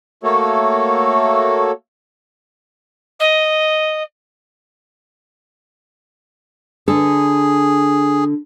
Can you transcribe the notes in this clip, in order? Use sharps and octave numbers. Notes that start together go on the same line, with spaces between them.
A3 A#3 F#4 A4 C#5
D#5
D3 G#4 A4